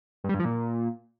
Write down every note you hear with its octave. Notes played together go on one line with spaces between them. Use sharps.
G2
G3
G2
F3
A#2